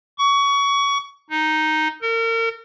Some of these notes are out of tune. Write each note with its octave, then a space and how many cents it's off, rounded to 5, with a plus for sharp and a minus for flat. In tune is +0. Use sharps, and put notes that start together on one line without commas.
C#6 +25
D#4 +0
A#4 -35